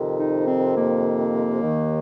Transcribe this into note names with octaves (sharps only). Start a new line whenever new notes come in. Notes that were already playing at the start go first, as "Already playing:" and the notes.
Already playing: F2 C3 D#3
D#4
C4
A#3
D#2 D#3